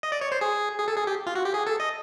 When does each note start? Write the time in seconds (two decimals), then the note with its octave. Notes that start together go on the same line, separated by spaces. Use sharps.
0.03 D#5
0.12 D5
0.21 C#5
0.32 C5
0.41 G#4
0.78 G#4
0.88 A4
0.97 G#4
1.07 G4
1.27 F4
1.35 F#4
1.45 G4
1.54 G#4
1.67 A4
1.80 D#5